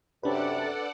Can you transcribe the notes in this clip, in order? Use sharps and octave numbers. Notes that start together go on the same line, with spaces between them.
F#2 C3 D4 A4 B4 D5 F#5